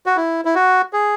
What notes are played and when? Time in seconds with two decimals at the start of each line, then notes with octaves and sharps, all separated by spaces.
0.06 F#4
0.16 E4
0.45 E4
0.55 F#4
0.93 G#4